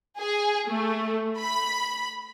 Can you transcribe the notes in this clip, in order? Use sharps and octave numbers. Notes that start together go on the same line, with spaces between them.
G#4
A3
B5